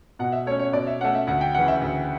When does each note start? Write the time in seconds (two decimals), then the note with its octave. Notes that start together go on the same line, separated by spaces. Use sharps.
0.19 B2 F#5
0.32 E5
0.46 A3 C#5
0.51 C#4
0.59 C#5
0.73 B2 D5
0.87 E5
1.01 A3 C#4 F#5
1.15 E5
1.27 D2 F#5
1.41 G5
1.54 C#3 E3 F#5
1.68 E5
1.81 D2